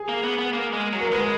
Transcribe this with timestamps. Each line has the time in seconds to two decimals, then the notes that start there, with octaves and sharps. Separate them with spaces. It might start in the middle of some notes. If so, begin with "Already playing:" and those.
Already playing: G#4
0.09 A#3
0.23 B3
0.38 B3
0.53 A#3
0.73 G#3
0.93 F#3
1.01 A#4
1.12 G#3 B4